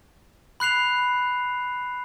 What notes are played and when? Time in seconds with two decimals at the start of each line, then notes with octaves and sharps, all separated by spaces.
0.60 B5 F#6 C7 F7